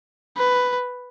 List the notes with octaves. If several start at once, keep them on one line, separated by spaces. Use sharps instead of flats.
B4